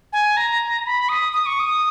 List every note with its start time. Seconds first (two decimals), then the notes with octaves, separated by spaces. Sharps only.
0.13 G#5
0.37 A#5
0.86 B5
1.09 D#6
1.33 D#6
1.46 C#6
1.60 D#6